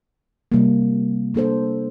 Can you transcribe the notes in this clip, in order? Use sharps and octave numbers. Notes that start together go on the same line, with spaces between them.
C3 G3 A#3
A#3 D4 A4 C5